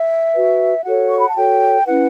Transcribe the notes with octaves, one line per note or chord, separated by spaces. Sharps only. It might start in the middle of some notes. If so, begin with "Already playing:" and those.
Already playing: E5
F#4 B4
F#4 A4 C#5 F#5
C#6
B5
A5
F#4 A4 C#5 G5
C#4 E4 B4 F#5